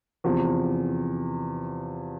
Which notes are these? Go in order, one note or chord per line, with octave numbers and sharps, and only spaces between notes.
E2 C3 F3